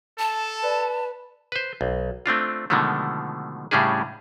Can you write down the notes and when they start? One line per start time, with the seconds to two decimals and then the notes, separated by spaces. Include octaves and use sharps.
0.19 A4 A5
0.63 B4 D5
1.52 B4 C5
1.81 B1
2.26 A3 C4 D4 F4
2.70 B2 D3 D#3 F3 G#3 A3
3.71 A2 C#3 G3 C#4 D4 G#4